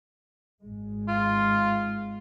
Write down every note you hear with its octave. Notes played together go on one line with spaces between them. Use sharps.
G#1 G#3
F4